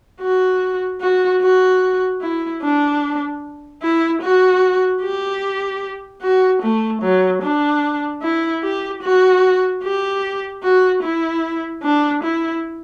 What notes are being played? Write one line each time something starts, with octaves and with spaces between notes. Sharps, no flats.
F#4
F#4
F#4
E4
D4
E4
F#4
G4
F#4
A3
F#3
D4
E4
G4
F#4
G4
F#4
E4
D4
E4